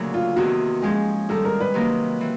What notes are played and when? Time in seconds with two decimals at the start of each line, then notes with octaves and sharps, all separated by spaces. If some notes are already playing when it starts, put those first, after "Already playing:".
Already playing: D2 A#2 C#3 F#3 A#3
0.14 F4
0.36 E2 C3 D#3 F#4
0.82 G#2 F3 G#3 C#4 G#4
1.29 G#2 D#3 G3 A4
1.45 A#4
1.60 B4
1.74 C3 D#3 F#3 A#3 D#4
2.21 E3